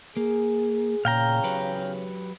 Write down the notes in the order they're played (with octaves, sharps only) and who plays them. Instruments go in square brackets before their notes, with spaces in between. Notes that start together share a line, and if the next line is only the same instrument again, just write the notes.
[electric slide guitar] A#3 [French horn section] G#4
[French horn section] E2 C#3 C#5 [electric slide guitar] A#2 [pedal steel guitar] F5 G5 A#5
[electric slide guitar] F#3 G4 B4